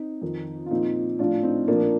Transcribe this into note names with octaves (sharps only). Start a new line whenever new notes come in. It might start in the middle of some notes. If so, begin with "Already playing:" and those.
Already playing: C4 D#4
F2 D#3
F4
A#2 F3 C4 D#4
A2 F3 D4 F4
C4 D#4
A#2 F3 A#3 D4